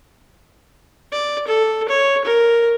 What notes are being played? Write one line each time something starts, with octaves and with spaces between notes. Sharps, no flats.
D5
A4
C#5
A#4